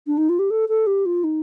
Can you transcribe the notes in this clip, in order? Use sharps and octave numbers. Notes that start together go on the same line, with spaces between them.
D4
D#4
F4
G4
A4
A4
G4
F4
D#4